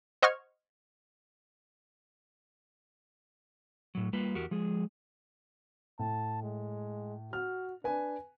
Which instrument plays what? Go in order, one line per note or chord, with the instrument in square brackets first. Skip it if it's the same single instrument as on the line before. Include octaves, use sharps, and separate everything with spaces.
[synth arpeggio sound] C5 D#5 F#5 C#6 F6 G#6
[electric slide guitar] A2 F#3
G3 A#3 F4 B4
E2 F#4 G4 A#4
F3 G#3 G#4
[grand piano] A2 [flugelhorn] A5
[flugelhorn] G#3
[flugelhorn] F#4 [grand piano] F6
[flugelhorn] D4 [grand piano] B4 G#5